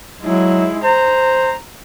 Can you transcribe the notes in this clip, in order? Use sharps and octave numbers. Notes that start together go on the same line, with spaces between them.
F#3 G#3 E4
C5 A#5